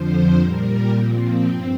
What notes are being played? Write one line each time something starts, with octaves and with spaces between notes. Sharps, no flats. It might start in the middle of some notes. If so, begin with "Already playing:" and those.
Already playing: F2 D3 F3 C5
A#2 G3 A#4
A#2 F3 C4
G2 C4